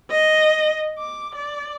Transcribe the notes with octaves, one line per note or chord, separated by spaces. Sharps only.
D#5
D6
D5